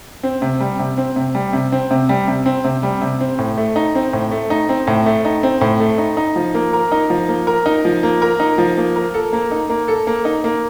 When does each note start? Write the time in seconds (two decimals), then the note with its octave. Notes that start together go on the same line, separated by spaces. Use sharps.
0.23 C4
0.42 C3
0.60 G3
0.79 C3
0.98 C4
1.16 C3
1.35 G3
1.53 C3
1.72 C4
1.91 C3
2.09 G3
2.28 C3
2.46 C4
2.64 C3
2.83 G3
3.02 C3
3.21 C4
3.39 A2
3.57 A3
3.76 D#4
3.95 C4
4.13 A2
4.31 A3
4.50 D#4
4.69 C4
4.87 A2
5.06 A3
5.25 D#4
5.43 C4
5.61 A2
5.80 A3
5.98 D#4
6.17 D#4
6.36 F3
6.55 A#3
6.73 A#4
6.92 D#4
7.10 F3
7.29 A#3
7.47 A#4
7.66 D#4
7.85 F3
8.03 A#3
8.22 A#4
8.40 D#4
8.58 F3
8.78 A#3
8.96 A#4
9.14 A4
9.33 A#3
9.51 D#4
9.70 A#3
9.88 A4
10.07 A#3
10.25 D#4
10.44 A#3